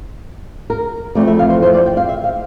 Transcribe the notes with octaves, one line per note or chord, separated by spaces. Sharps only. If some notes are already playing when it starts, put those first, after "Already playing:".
A#4
F2 E3 A3 C4 D5
E5
F5
C5
C5
D5
G5
F5
E5
F5